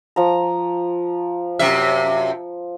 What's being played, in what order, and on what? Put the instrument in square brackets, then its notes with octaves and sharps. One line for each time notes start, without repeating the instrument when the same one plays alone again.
[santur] F3 A#5
[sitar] F#2 C3 E5